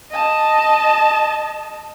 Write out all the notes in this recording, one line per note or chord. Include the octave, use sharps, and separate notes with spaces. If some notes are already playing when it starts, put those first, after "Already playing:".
D#5 A5